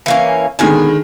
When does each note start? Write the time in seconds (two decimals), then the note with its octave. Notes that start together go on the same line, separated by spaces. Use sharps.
0.06 E3 A#3 C#4
0.59 B2 D3 D#3 G#3 B3 G#5